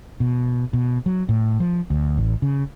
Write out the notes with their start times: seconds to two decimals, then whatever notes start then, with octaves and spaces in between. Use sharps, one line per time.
0.20 B2
0.73 B2
1.06 F#3
1.29 A2
1.60 F3
1.90 D2
2.18 A1
2.42 C#3